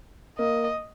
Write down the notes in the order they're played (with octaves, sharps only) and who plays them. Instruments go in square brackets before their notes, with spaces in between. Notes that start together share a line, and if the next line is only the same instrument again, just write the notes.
[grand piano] A#3 [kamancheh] D#5